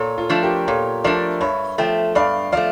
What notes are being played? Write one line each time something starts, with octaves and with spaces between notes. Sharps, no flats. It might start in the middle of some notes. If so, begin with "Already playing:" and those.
Already playing: A#2 A4 C#5
F4 A4
F3 A3 D4
G4 A#4
A#2 A4 C#5
F3 A3 D4 A#4 D5
G2 C#5 E5
F3 A3 E5 G5
G2 D5 F5
F3 A3 D5 F5